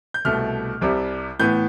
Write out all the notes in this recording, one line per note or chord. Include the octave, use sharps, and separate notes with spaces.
G6
C2 B2 A3 F6
C2 C3 G3
A2 E3 B3 G6